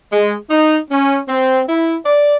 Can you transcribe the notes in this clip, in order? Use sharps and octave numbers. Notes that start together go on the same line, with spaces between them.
G#3
D#4
C#4
C4
E4
D5